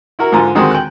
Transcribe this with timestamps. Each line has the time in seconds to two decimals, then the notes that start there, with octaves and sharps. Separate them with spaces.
0.19 E4 F#4 A#4
0.32 G#2 D3 F4 A#5
0.55 D3 D#3 G#3 C4 F#4
0.71 G5 F#6